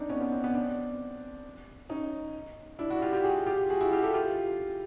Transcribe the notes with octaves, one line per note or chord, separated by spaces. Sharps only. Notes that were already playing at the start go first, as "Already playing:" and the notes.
Already playing: C4 D4 D#4
B3 C#4
B3 C#4
C4
B3 C#4
C4 D4
C#4 D#4
D4 E4
E4 F#4
F4 G4
F4 G4
F#4 G#4
F4 G4
F#4 G#4
E4 F#4
F4 G4
G4 A4
F4 G4